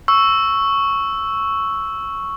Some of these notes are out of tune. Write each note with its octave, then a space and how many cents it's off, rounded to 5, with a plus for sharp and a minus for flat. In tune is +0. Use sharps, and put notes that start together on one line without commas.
C#6 +0 E6 +0